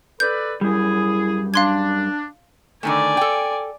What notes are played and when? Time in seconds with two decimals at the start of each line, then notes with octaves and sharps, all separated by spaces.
0.20 A4 B4 D5 G6
0.61 F#2 G3 E4 G#4
1.54 D4 F5 C6 G#6
2.83 D3 D#3 A3 D5 G#5
3.17 A4 G5